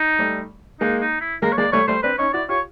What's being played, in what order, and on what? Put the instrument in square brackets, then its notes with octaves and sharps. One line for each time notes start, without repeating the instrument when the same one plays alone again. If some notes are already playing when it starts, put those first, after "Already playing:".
Already playing: [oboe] D#4
[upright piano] G3 A3
[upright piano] G#3 A#3 [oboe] D#4
[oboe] D#4
E4
[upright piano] G#3 A#3 [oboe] A#4
[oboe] C#5
[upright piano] G#3 A#3 [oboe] D5
[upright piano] G3 A3 [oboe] C#5
[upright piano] G3 A3 [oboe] C5
[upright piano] C4 D4 [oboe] B4
[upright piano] C#4 D#4 [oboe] C#5
[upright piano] E4 F#4 [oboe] D5
[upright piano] F4 G4 [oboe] C#5